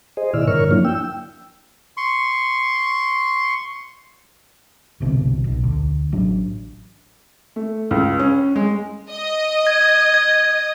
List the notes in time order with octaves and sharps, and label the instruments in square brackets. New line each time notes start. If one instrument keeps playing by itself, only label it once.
[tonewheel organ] G#4 C5 D#5
A#2 D#3 E4 D5 E6 F6
G2 D3 A#4 C#5 C#6 F6
F3 F#3 A#3 D4 E4
G5 E6
[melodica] C6 C#6
[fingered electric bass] G1 C2 B2 D3
B1 B2
D2
A1 F#3 D4
[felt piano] A3
C#2
C#4
G#3
[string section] D#5
[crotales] G#6
G#6